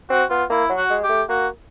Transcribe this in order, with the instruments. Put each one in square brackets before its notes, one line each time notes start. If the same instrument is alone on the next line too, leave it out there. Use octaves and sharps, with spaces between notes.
[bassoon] C4 [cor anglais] F#4
[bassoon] B3 [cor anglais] F4
[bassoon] A#3 [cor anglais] E4
[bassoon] F#3
[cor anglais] F#4
[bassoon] G#3
[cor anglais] G4
[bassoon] A3
[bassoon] A#3 [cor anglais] F#4